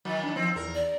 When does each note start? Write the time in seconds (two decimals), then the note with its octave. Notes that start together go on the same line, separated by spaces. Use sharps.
0.05 D#3 F#3
0.24 D4
0.36 F3 C4
0.56 E2 A#4
0.75 D5